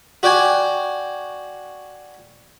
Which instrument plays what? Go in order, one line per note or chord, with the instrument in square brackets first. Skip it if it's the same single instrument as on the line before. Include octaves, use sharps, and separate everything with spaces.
[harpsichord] F#4 D5 G5 G#5